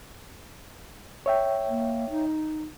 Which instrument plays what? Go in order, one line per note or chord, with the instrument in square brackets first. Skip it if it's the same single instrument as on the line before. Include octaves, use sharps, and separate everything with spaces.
[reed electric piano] C#5 E5 G5
[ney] A#3
D#4